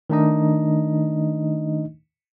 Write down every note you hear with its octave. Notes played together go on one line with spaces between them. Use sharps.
D#3 A3 D4 D#4 D#5